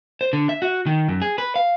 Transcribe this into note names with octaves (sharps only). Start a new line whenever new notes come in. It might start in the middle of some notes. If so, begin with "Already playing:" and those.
C5
D3
E5
F#4
D#3
F#2
G#4
B4
F5